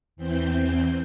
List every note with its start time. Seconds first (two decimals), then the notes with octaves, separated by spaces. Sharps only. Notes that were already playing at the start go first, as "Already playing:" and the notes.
0.16 E2 E3 C4 G6